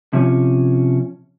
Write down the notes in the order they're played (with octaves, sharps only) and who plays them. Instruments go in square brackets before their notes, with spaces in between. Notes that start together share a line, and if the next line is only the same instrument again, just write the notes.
[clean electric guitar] C3 F3 C#4